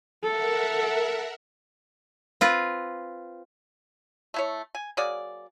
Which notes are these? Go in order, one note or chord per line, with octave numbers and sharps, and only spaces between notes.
A4 A#4 E5 F#5
C4 F4 B4
A3 E4 C#5
G#5
F#3 A#3 G#4 D5